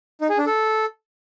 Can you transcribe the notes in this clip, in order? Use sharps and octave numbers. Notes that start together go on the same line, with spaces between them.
D#4
G#4
D4
A4